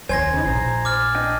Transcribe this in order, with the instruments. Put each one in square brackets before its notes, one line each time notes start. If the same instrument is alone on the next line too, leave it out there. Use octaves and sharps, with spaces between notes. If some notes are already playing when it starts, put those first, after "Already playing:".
[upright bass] D#2 C#4 [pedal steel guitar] C5 C#5 C6 [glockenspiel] G#5 G#6 A#6
[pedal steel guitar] C#3 E3 D#4
[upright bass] A#1 [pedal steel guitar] C5 A#5
[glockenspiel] D6 F6 A6
[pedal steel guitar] D4 D#5 G5